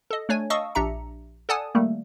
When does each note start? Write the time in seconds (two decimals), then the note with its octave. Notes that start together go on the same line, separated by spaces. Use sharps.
0.11 A4 D#5
0.29 A3 D4 C#5 G#5
0.50 D#5 F5 A5 C#6 D#6 E6
0.75 A#1 D4 G4 E5 A#5 C#7
1.49 A4 D5 F#5 G#5 A5 D#6
1.75 D#3 G3 A3 A#3